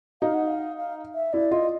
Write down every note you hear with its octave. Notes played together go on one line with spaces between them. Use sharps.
D#4 F5
F#5
F5
F5
E5
E4 D5
F4 D#5